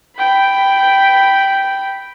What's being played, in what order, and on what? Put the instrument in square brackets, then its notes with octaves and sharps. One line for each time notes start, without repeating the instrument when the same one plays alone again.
[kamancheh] G5 B5